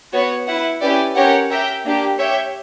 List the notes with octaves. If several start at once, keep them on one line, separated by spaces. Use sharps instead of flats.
B3 F#4 C#5
E4 B4 F#5
C#4 E4 G4 B4 D5
C#4 G4 A#4 C#5 F#5
G4 A#4 E5 G5
A#3 D4 G4
G4 C#5 E5 G5